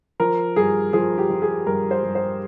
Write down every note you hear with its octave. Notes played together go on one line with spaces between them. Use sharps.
F3 A#4
G2 G#4
F3 G#4
G4
F3
G#4
G2 A#4
C5
G2
C5